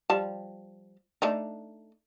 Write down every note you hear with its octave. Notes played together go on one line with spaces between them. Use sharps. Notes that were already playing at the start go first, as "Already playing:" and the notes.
F3 G3 A5
A3 D4 D#4